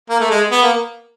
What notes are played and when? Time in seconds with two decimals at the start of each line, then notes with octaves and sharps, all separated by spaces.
0.10 A#3
0.20 A3
0.31 G#3
0.51 B3
0.62 A#3